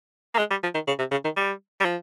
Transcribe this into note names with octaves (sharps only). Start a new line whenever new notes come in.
A#3
G#3
G3
F3
D#3
C#3
C3
C#3
D#3
G3
G3
F3